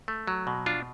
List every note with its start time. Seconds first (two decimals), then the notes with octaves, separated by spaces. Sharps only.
0.08 A3
0.27 F#3
0.47 B2
0.66 D4 F4